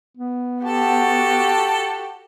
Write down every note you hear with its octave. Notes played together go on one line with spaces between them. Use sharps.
B3
F#4 G4 A4 A5